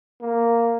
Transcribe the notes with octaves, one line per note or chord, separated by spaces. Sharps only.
A#3